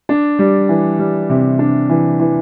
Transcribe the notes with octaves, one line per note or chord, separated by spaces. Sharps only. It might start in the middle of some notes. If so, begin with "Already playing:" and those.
D4
G3
E3
G3
C3
D4
E3
E3